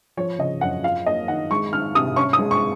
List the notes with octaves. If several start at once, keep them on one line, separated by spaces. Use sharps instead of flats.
F3 C#5
C#3 D#5
F#2 F#5
F4 F5
A#3 D#5
D#3 F#5
G#3 C#6
D#3 F6
C3 D#6
C#4 C#6
D#6
G#3
C#6